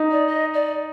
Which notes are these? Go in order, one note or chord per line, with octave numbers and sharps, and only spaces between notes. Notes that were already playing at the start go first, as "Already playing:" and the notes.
Already playing: D#4
D5
D#5
D5